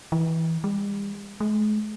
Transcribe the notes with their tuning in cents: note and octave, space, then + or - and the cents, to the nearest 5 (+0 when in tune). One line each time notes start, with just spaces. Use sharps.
E3 -15
G3 +45
G#3 +40